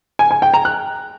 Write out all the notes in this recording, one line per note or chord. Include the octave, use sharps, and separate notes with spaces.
G#5
G#5
G5
A#5
F#6